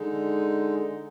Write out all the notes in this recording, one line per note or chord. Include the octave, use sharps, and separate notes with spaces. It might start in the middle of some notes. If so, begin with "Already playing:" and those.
Already playing: D3 G#3 D#4